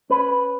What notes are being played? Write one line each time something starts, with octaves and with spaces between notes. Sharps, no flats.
C#4 B4